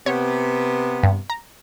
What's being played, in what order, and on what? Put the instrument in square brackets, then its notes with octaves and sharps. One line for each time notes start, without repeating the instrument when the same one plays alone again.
[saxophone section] C3 B3 [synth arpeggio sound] C#5
[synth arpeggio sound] G2
A#5